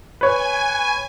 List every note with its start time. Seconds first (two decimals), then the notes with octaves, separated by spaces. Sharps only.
0.21 B4 C#5 G#5